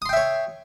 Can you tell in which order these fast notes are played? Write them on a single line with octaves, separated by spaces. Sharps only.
D#6 C6 G5 E5 C#5